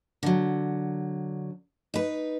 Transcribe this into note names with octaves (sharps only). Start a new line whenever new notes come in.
D3 F#3
D#4 B4